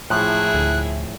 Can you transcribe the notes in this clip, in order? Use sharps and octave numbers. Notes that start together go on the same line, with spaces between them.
A2 F3 E4 G#4 F#6
D2